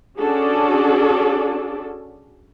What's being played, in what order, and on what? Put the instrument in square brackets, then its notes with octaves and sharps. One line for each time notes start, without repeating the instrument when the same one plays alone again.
[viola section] C#4 D4 F#4 G#4 A4 D5